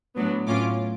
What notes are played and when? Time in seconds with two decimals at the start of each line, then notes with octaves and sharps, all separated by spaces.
0.17 A2 F#3 B3 D4
0.47 A2 F#3 C#4 F4 D6